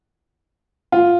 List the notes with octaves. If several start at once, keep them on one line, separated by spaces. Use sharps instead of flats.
F4